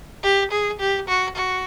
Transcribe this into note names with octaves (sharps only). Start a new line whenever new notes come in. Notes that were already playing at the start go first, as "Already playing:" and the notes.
G4
G#4
G4
F#4
F#4